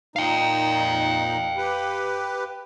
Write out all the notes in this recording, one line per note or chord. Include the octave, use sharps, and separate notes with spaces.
A#2 D#4 F5 G5
G4 B4